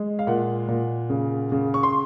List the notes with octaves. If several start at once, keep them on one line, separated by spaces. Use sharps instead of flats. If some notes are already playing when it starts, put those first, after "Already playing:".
Already playing: G#3
F5
A#2 F#5
A#2
C#3
C#3
C#6
C6